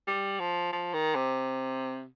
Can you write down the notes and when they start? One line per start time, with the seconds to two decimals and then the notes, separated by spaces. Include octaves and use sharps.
0.07 G3
0.40 F3
0.73 F3
0.94 D#3
1.16 C3